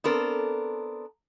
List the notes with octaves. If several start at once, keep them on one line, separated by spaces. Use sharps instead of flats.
B3 C4 D4 A4 A#4